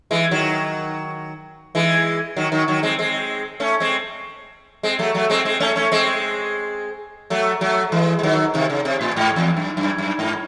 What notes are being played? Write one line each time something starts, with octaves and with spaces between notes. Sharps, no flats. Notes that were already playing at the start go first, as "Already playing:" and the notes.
E3 G#3
D#3 F#3
E3 G#3
D#3 F#3
D#3 F#3
D#3 F#3
G#3 C4
G#3 C4
A3 C#4
G#3 C4
G#3 C4
F#3 A3
F#3 A3
G#3 C4
G#3 C4
A3 C#4
A3 C#4
G#3 C4
F#3 A3
F#3 A3
E3 G#3
G#3
D#3 F#3
C3 D#3
C#3
C3
A2
G#2
E2
F#2
F#2
F#2
G#2